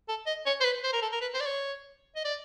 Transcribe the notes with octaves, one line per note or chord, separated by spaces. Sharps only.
A4
D#5
C#5
C5
B4
C5
A#4
A4
A#4
B4
C5
D5
C#5
D#5
D5